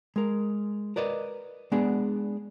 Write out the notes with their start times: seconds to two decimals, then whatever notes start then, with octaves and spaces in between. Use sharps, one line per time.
0.16 G#3 A#4
0.96 A#4 B4 D5 D#5
1.72 G#3 B3 D4 G#4 D5